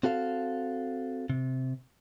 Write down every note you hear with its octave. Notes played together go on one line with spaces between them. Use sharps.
C4 F#4 A4 F5
C3